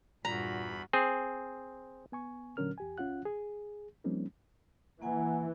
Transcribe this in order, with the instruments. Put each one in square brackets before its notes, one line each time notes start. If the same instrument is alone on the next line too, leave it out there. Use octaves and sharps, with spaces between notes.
[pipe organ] E2 B5 [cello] G2 F#4 [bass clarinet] A#2 [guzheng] A#5
[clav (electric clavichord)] C4 G#4
[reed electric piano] B3 G#5 C#6
A#2 D3 F#3 C#4 A#4 F6
E2 G4 G#5
C#2 C#4 F4 F#5 F#6
G#4
F3 G3 A#3 C4 C#4 D#4
[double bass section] E3 [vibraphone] A#3 F#5 G#5